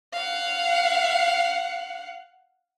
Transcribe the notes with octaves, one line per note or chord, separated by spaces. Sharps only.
F5 F#5